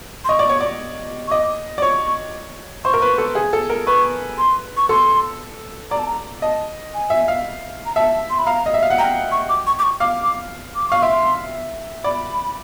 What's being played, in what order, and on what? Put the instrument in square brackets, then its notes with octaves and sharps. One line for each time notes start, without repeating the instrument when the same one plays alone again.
[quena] C6
[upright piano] D#5 [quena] C#6
[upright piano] D5
C#5
D5
[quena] C#6
[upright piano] D#5 [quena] D6
[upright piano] D5
[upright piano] C#5 [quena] C#6
[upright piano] C5 [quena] C#6
[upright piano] A#4
B4
A4
G#4
A4
A#4
[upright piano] B4 [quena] C#6
[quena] C6
C#6
[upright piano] A4 [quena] C6
[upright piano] D5 [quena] A#5
[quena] A5
A#5
[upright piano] D#5 [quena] A5
[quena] G#5
[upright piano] E5
F5
[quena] A#5
[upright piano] E5 [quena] A5
[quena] C6
B5
[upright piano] F5 [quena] A#5
[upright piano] D#5
E5
F5
F#5
[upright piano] G5 [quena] A#5
[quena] C#6
D6
C#6
D6
C#6
[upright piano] F5 [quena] D6
[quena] D6
[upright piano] F5 [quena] C#6
[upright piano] E5 [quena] C6
[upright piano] D5 [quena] B5